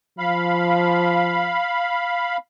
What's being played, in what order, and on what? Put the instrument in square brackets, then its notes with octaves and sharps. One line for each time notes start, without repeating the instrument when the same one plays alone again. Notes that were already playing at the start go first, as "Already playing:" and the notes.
[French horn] F3 [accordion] F5 B5